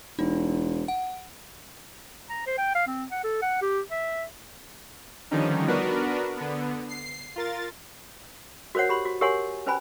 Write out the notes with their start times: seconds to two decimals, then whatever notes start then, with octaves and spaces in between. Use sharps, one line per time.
0.19 E1 D#4
0.88 F#5
2.30 A#5
2.46 C5
2.58 G5
2.75 F5
2.87 C4
3.11 F#5
3.24 A4
3.42 F#5
3.62 G4
3.91 E5
5.31 D3 D#3 F3 G3 C#4 D#4
5.67 B3 D4 F#4 A#4 B4
6.37 D3 B3
6.89 C7
7.36 F4 A#4 A6
8.75 F#4 A#4 C5 C#5 F#5
8.89 G4 B5 C6
9.05 F#4
9.21 G4 A#4 C#5 F#5 G#5 C6
9.66 C#4 B4 C5 G#5 B5